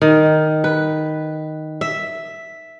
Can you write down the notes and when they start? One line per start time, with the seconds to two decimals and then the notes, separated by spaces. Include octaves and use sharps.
0.02 D#3
0.64 B4
1.81 E5